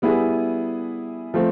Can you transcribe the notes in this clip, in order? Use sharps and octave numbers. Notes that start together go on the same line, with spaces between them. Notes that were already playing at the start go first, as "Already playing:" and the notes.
G3 B3 E4 G#4
F3 A3 C4